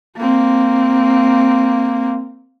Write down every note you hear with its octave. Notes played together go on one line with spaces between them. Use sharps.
A#3 C4